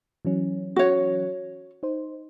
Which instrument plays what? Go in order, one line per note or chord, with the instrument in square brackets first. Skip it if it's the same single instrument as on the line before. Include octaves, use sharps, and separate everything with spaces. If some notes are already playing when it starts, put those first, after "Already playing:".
[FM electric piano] E3 F#3 C#4
[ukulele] F#4 C#5
[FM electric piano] D#4 C5